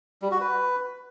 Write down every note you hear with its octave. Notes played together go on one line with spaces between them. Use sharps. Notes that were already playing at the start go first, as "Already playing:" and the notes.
G3
F#4
B4